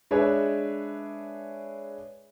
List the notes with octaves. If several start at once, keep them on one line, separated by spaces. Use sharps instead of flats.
G#3 D4 G#4 B4 C#5 E5